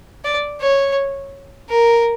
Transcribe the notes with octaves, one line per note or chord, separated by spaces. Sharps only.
D5
C#5
A#4